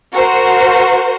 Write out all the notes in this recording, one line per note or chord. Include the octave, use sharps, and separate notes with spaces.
F#4 A#4 C5